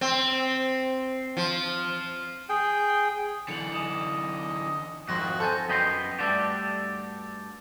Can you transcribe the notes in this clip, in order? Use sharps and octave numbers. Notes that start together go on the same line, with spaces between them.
C4
F3
G#4 G5
D3 E3 C#7 F7 F#7
D#5 G#5 D#6 E7
G#1 F2 F#4 C6 A#6
A4 C5 G#5 C6 G6 A6
F#2 B3 D#5 G5 B5 C6
G2 A3 D4 F#4 G4